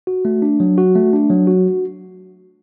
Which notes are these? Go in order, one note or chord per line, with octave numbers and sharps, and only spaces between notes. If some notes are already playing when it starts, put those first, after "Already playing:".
F#4
A3
D4
F#3
F#4
A3
D4
F#3
F#4